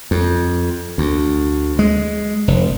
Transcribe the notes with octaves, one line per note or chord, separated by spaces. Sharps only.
F2
D2
G#3
F1